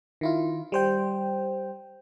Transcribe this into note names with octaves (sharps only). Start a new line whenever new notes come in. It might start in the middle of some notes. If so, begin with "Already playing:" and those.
D#3 E4 F4
G3 C5 G5